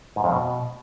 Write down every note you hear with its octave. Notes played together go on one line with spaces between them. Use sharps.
G#2
F2
B2